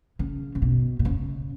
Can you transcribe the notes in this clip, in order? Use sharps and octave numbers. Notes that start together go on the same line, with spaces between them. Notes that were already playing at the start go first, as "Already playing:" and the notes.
C#3
C#3
B2
B2
C#3